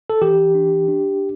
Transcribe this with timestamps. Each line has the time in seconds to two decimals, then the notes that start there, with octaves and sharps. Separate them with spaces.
0.10 A4
0.22 E3 G4
0.55 D4
0.88 D4